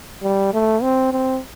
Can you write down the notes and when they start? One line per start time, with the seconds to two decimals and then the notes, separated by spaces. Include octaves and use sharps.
0.23 G3
0.53 A3
0.83 C4
1.12 C4